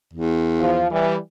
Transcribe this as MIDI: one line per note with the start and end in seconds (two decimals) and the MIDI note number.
0.13 0.90 40
0.60 0.86 53
0.60 0.86 65
0.91 1.16 52
0.91 1.16 55